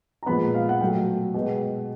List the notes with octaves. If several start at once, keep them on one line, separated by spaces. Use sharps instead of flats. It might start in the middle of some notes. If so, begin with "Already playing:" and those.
A#5
A#2 F3 G#3 B3 B5
F5
F#5
B2 F#3 A3 G5
B2 G#3 B3